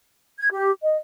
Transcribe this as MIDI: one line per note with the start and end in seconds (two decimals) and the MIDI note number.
0.38 0.47 92
0.52 0.71 67
0.82 0.98 75